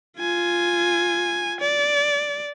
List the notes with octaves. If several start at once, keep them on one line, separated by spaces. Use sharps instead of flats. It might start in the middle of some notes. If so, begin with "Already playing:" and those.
F4 G#5
D5